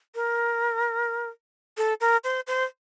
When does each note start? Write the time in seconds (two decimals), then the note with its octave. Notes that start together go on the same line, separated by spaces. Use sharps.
0.15 A#4
1.78 A4
2.01 A#4
2.24 C5
2.47 C5